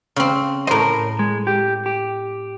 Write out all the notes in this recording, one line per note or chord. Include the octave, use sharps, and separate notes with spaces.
C#3 C4
A2 A#4 C5 D#5
A#4
G#3
G4
G4